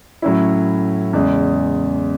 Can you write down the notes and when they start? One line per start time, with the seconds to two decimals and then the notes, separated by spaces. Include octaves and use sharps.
0.22 A2 F#3 C#4 E4
1.13 E2 C#3 G#3